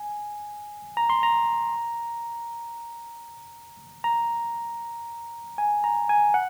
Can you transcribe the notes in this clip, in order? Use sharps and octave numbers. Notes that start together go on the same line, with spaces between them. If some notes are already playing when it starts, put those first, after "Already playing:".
Already playing: G#5
A#5
C6
A#5
A#5
G#5
A#5
G#5
F#5